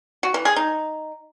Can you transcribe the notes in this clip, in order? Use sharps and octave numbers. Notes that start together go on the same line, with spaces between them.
F#4
E3
G#4
D#4